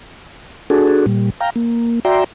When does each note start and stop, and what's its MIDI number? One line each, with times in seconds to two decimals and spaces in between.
0.70 1.06 62
0.70 1.06 66
0.70 1.06 68
0.70 1.06 69
1.06 1.30 46
1.06 1.30 55
1.41 1.50 77
1.41 1.50 79
1.41 1.50 82
1.56 2.00 58
2.05 2.24 66
2.05 2.24 74
2.05 2.24 76
2.05 2.24 79
2.05 2.24 82
2.05 2.24 84